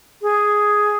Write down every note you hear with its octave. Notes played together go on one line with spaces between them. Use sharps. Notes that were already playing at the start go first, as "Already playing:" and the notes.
G#4